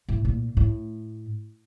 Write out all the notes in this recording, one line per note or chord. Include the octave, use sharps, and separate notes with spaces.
A2
A#2
A2